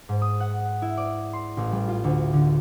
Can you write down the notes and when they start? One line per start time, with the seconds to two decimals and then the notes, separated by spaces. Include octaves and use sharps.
0.09 G#2
0.22 D#6
0.40 F#5
0.82 E4
0.97 D5
1.33 C6
1.57 A1
1.72 G3
1.88 F4
2.04 D2
2.33 D3